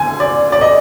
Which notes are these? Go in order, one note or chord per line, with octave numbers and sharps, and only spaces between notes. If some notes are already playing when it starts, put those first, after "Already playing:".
Already playing: D2 D3 G#5
D5
D5
D#5